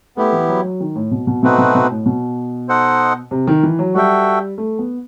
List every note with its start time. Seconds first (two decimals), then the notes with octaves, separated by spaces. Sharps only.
0.17 A3 B3 E4 G4
0.33 E3
0.49 F#3
0.64 F#3
0.80 D#3
0.95 A2
1.11 B2
1.27 B2
1.43 B2 A3 C4 D#4 F#4 B4
1.58 B2
1.75 B2
1.91 A2
2.06 B2
2.69 D#4 A4 C5 D#5 F#5
3.31 C3
3.47 D#3
3.63 E3
3.79 F#3
3.94 G3 F#4 A4 E5 G5
4.58 A3
4.79 B3